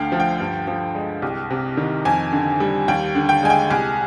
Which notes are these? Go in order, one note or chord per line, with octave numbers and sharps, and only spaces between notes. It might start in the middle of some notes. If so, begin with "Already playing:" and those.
Already playing: D2 D3 F5 G5
F3
G5
G2
F3
G#3
C2
C3
D#3
F2 G#5
D3
G3
D#2 G5
D3
G5
G#3 G#5
G5
C2 G#5